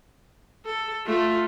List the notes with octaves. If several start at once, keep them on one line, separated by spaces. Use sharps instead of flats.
A4
A3 F4